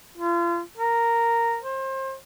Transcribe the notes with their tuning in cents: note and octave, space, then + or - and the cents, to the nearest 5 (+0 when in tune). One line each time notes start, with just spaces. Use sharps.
F4 -35
A#4 -5
C5 +30